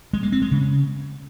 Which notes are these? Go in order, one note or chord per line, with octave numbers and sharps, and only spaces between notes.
G#3
A#3
C4
G#3
C#3